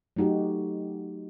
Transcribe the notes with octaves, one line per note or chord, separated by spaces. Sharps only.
F#3 A3 D#4 F#4 G4